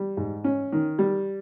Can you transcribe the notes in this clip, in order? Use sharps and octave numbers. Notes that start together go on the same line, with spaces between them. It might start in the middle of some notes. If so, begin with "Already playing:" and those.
Already playing: G3
G#2
C#4
D#3
G3